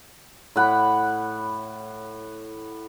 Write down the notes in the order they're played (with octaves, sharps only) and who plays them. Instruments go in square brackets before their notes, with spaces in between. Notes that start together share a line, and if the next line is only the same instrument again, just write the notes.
[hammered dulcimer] A2 F#5 B5